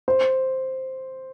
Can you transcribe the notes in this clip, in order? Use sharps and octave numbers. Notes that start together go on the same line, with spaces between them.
C5